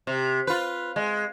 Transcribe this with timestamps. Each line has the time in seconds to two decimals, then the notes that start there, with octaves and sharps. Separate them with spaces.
0.07 C3
0.47 F4 B4
0.96 G#3